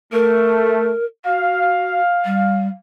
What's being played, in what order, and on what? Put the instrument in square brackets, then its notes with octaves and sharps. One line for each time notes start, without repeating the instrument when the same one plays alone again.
[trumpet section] A3 [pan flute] A#4
[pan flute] F#4 [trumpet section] F5
[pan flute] G3